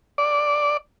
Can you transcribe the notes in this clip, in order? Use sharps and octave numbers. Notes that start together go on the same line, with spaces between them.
D5